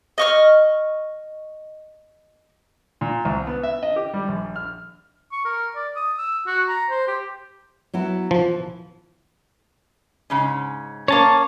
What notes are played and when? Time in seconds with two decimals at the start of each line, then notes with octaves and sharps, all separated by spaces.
0.18 D#5 C#6 F6
3.01 A#2
3.25 C2
3.47 B3
3.63 E5
3.83 D#5
3.96 G4
4.14 G3
4.29 A#1
4.56 F6
5.32 C#6
5.45 A#4
5.75 D5
5.96 D#6
6.18 E6
6.46 F#4
6.68 A#5
6.90 C5
7.07 G4
7.94 F#3 B3 E4
8.31 E3 F3
10.30 G#2 C#3 C#4
11.08 A#3 C#4 C#5 A5